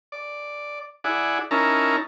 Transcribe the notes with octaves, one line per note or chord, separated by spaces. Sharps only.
D5
E4 G#4 D5 F#5
C#4 D#4 E4 A#4 A5 A#5